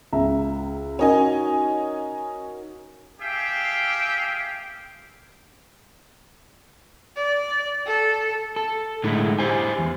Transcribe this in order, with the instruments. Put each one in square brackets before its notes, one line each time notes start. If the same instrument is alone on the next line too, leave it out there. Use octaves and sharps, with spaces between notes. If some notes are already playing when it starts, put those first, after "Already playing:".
[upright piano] C#2 E5 A#5
[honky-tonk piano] C#4 D#5 G#5 [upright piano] D#4 F#4 A#4
[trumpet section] G4 G#4 E5 F5 G5
[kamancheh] D5
A4
[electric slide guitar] A4
A2 D3 G#3 A3 D#4 E4
E4 G4 C5 G#5
E2